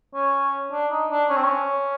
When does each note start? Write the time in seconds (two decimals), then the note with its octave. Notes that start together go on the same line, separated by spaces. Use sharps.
0.14 C#4
0.72 D4
0.91 D#4
1.11 D4
1.30 C#4
1.36 C4
1.44 C#4